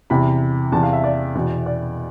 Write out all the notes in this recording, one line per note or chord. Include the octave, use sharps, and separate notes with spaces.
E2 C3 E3 B5
E2 C3 E3 A5
F5
E5
D5
E2 B2
D5